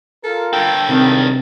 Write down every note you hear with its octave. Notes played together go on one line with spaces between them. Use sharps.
F4 A4 A#4
G2 A4 G5
C#2 C3 D#3